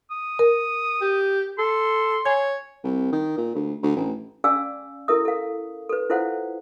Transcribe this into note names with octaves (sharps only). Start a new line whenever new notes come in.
D#6
A#4
G4
A4 C6
C#5 G#5 G#6
C2
D#3
A#2
D2
D2
A1
C#4 G#4 D5 F5 G#5 E6
E4 A4 A#4 E5 D#6
A4 F5
A4 B4
E4 F4 A4 C5 F5 F#5